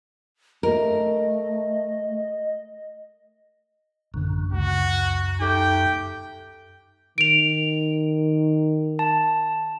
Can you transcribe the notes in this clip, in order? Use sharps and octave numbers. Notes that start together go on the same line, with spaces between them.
A3 A#4 D#5
A1 F#2 D3
C#2 F#4
A3 D#4 G4 G5
D#3 D7 F7
A5